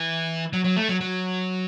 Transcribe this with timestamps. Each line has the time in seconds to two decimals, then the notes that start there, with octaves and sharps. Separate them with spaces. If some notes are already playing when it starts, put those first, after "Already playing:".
Already playing: E3
0.53 F#3
0.64 F#3
0.77 A3
0.89 F#3
1.00 F#3